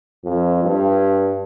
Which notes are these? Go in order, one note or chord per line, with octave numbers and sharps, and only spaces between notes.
F2
G2